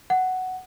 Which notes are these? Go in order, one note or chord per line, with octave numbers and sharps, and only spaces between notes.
F#5